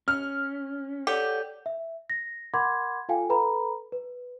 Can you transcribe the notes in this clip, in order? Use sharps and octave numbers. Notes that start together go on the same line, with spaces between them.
C#4 F6
G4 A4 C#5 D5 F#5
E5
A#6
A#4 F#5 B5 C6 D6 G#6
F4 A4 F5 G5 G#5
A4 B4 A#5 B5
B4